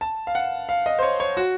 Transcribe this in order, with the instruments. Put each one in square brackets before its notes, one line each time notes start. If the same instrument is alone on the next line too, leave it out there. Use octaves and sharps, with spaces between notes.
[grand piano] A5
F5
F#5
F5
D#5
C5
C#5
C#5
F#4